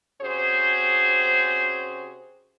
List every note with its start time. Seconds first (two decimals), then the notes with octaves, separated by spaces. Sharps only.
0.21 C3 C#4 F#4 G#4 C5